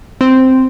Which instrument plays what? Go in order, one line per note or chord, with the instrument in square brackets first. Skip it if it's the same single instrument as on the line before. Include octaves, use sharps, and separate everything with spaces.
[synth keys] C4